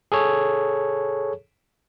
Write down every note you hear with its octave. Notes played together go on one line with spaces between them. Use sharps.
G#4 A4 C#5